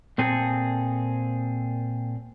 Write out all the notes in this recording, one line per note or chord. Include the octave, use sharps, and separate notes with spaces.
A#2 C4 G#4 A4